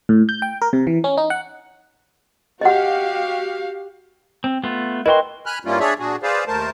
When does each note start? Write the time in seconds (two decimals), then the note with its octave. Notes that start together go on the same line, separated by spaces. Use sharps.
0.09 A2
0.29 G6
0.42 G5
0.62 A#4
0.73 C3
0.87 E3
1.04 C#4
1.17 D#4
1.30 F#5
2.61 F#4 G4 D#5 F5 F#5
4.44 C4
4.64 A3 B3 F4
5.06 E4 F#4 A#4 B4 D#5 G5 C6
5.46 G#5 B5 F6 F#6
5.65 G2 G3 A#3 C#4 E4 F4
5.80 D4 G#4 C#5 D5 E5
5.99 A#2 D4 F#4 G#4
6.23 G#4 B4 C5 D5 F5
6.47 D#2 A3 A#4 C5 A5